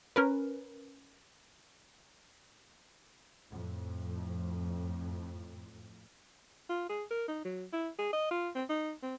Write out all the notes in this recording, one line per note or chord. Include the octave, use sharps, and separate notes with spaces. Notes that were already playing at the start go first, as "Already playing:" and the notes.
C#4 A#4 B4
F2 A2
F4
G#4
A#4
D#4
F#3
E4
G#4
D#5
F4
C4
D#4
C4